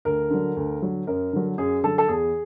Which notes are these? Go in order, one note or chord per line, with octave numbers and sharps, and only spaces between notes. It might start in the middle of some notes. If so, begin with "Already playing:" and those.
D2 A#4
D3 F#3
D2
D3 F#3
F#2 A#4
D3 F#3
F#2 G#4
D3 F#3 A4
A4
E2 G#4